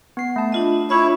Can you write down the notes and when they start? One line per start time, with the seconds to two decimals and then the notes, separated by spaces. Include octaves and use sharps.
0.17 B3 C7
0.36 A3 A5
0.52 D4 F4 D#5
0.90 D4 E4 F4 C#5 E5